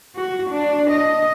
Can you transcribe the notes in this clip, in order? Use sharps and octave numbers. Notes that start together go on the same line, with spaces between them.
F#4
D4
D#5